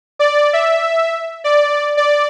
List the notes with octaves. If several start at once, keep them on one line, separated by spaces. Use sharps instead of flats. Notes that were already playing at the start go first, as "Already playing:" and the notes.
D5
E5
D5
D5